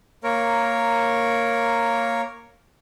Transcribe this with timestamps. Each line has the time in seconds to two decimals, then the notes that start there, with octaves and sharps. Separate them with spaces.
0.24 A#3 A#4 C#5